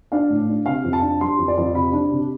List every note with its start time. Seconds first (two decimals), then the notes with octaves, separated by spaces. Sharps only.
0.12 D4 F5
0.30 A2
0.49 D4
0.66 C3 F5
0.84 F2
0.93 A5
1.02 D4
1.21 G3 C6
1.38 F2
1.48 D5
1.57 F2
1.74 C3 B5
1.93 D4
2.11 C3